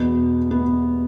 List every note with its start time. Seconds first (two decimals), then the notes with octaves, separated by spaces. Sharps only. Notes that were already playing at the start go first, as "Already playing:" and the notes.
Already playing: E2 B2 B3
0.51 B3